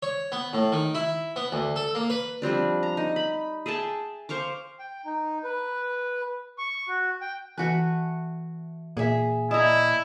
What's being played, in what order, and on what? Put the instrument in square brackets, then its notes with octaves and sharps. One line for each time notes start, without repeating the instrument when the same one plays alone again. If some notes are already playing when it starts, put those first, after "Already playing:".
[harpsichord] C#5
B3
A2
D#3
E4
B3
D2
A4
A#3
B4
[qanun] F3 G3 C4 D4
A#5
D#4
B5
G#4 E5 G5 A5
C5 F5 C#6 D6
[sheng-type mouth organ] G5
D#4
B4
C#6
F#4
G5
[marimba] E3 G#5 F#6 [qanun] A3 F#4 B4
[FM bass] A#2 [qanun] G#4 E5
[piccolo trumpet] E4 [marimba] D5 D#5 D#6 [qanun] A5 A#5